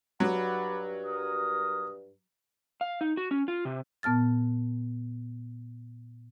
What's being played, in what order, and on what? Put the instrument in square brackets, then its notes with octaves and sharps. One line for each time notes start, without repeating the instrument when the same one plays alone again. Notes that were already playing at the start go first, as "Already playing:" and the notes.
[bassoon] G2 [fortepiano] F#3 [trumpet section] D5 F#5 B5
[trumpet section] A#4 D#6
[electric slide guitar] F5
D#4
F#4
C#4
F4
C3
[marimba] A#2 B3 A5 F6 A6